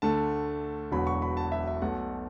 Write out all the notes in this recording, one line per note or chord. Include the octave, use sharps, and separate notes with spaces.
D2 D3 A3 A5
E1 E2 D3 F#3 B5
C#6
B5
A5
E5
E5
B1 B2 A3 F#5